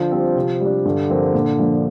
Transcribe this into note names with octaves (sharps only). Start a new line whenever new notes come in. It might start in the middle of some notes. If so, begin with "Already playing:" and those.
Already playing: D3 F3
G3 C4
C3
G3 D4
G2 D3
F3 C4 A#4
A#2
F3 A#3 D4